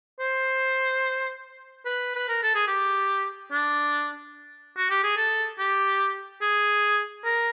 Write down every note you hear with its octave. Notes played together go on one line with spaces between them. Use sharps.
C5
B4
B4
A#4
A4
G#4
G4
D4
F#4
G4
G#4
A4
G4
G#4
A#4